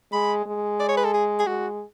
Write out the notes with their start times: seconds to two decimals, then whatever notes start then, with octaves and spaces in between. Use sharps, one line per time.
0.12 G#3 B5
0.46 G#3
0.80 D5
0.89 C#5
0.97 B4
1.05 A4
1.14 G#4
1.40 G#4
1.47 G#3 F#4